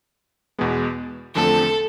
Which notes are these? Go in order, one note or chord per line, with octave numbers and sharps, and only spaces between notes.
E2 B2 G#3 B3
E2 D3 F3 A3 C4 A4